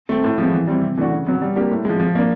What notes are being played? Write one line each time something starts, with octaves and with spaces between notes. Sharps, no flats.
A3 C4
A2
F3 G#3 B3
E3
G3 C4 E4
C3
E3 A3 D4 F#4
C#3
F#3 B3
G3
A#3 D4 G4
A2
F3 G#3
F3
A#3 D4